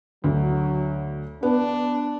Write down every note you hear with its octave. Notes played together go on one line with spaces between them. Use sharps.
D2 F#3
B3 D4